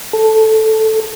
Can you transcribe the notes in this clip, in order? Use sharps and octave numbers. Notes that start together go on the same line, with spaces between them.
A4